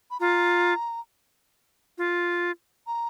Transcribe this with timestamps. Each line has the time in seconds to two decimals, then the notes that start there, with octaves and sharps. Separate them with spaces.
0.11 B5
0.20 F4 A#5
1.98 F4
2.87 A#5